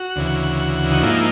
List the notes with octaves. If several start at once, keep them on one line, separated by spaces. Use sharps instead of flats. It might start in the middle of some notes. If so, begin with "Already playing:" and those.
Already playing: F#4
D2 C#3 E3
D#4
G#2 F3 A#3 D#4 E4